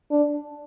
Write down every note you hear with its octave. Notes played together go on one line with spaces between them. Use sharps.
D4